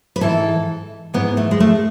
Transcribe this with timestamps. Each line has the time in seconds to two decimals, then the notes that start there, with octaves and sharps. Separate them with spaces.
0.16 B4
0.21 G#2 E3 A4
1.14 G#2 E3 B3
1.37 A3
1.51 G#3
1.60 A3